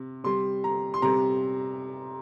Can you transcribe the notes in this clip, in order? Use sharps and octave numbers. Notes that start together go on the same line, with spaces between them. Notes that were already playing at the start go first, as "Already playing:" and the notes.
Already playing: C3
C3 G3 C6
A#5
C6
C3 G3 A#5